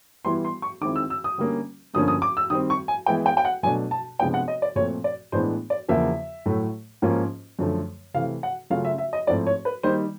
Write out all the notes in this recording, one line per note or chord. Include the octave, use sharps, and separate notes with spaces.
E3 G3 B3 E4 C6
C6
C#6
D#3 G#3 C4 E4 D6
E6
E6
D#6
D3 G3 A#3 C#4
G2 D3 F3 A#3 C#4 D#6
D#6
D6
E6
D#3 G3 C4 D#6
C#6
G#5
E3 G#3 B3 E4 G5
G5
G5
F#5
B2 F#3 A3 D4 G#5
A5
C3 F3 G#3 B3 D4 G5
F#5
D#5
D5
A#2 F3 A3 C4 C#5
D5
A2 E3 G#3 B3 D4 C5
D5
E2 C#3 F3 A#3 E5
A2 F#3 A3
G#2 F3 A#3 C#4 F4
F#2 D3 F3 A3
C3 E3 A3 F5
F#5
C#3 F#3 A3 C#4 F4 F5
E5
E5
D#5
G#2 F3 A3 C4 E4 D5
C#5
B4
D#3 G3 A#3 D#4 C5